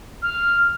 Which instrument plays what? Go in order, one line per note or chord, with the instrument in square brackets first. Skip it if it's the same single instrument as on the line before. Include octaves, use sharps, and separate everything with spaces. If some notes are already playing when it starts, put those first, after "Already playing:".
[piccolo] F6